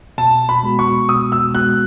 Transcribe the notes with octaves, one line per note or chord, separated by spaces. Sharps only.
B2 A5
B5
G#3 B3 F#4
C#6
B2 D#6
E6
G#3 B3 F#4 F#6